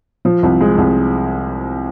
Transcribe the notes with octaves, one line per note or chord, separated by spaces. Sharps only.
F3
C2
G#3
C2